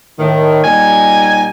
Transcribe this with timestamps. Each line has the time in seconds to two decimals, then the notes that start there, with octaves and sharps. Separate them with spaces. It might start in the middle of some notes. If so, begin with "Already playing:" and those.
0.19 A2 D#3
0.64 A#2 G3 D#4 G#5